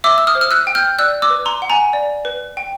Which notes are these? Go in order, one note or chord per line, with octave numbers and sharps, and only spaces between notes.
E5 D6 E6
E6
D#6 F6
C5
F6
E6 F#6
G5
F6 G6
D5 E6 F#6
D6 E6
B4
A#5 C6
F#5
G#5 A#5
D5
B4
G5